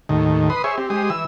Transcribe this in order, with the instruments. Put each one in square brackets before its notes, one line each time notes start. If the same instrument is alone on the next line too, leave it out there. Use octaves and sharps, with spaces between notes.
[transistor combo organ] D#2 A2 D#3
B4 C6 D#6
G#4 C5 C#5 E5
C4 G4
G#3 G4 C5 D#6
E3 E6